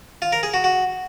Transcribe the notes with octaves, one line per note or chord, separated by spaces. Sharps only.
F4
A#4
G#4
F#4
F#4